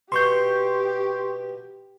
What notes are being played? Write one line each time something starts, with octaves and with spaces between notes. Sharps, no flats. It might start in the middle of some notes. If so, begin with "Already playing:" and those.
B2 G4 C6 C#6 G6